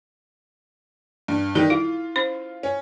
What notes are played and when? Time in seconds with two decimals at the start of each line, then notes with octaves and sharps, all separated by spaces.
1.28 G2
1.55 D#3 G3 D#4 A4
1.70 E4 F4
2.16 C#4 C5
2.63 C#4